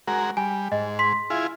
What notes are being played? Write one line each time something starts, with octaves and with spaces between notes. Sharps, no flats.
G#3 F#4 A#4
G3 G#5
G#2 D#5
C6 B6
E4 F4 G#4